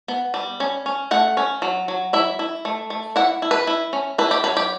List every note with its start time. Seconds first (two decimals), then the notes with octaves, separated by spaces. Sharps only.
0.08 B3
0.34 G3
0.60 C#4
0.86 C#4
1.11 A3 F#5
1.37 C#4
1.62 F#3
1.88 F#3
2.13 E4 E5
2.39 E4
2.65 A3
2.90 A3
3.16 E4 F#5
3.42 E4
3.51 B4
3.67 E4
3.93 C#4
4.18 E4 B4
4.31 G4
4.44 F#3 B4
4.57 G4